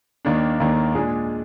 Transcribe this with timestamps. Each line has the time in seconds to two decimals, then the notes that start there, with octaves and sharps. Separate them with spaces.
0.25 D#2 D#3 A#3 D4
0.60 D#2 D#3 A#3 D4
0.95 A#2 G#3 D4 G#4